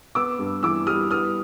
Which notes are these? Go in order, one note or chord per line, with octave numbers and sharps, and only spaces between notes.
B3 D6 E6
G2
E3 D6 E6
G3 D#6 F6
B3 D#6 F6